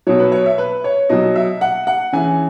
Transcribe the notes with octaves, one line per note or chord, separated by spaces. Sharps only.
B2 F#3 C#5
B4
C#5
E5
B4
C#5
B2 F#3 D#5
E5
F#5
F#5
C#3 E3 G#5